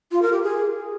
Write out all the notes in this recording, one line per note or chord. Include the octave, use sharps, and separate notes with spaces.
F4
A#4
G4
G#4